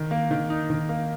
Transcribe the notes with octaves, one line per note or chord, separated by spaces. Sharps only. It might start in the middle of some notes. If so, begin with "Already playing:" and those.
Already playing: D#3
A#3
D#3
D#4
D#3
A#3